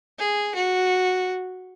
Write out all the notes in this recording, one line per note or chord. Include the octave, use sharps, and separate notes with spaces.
G#4
F#4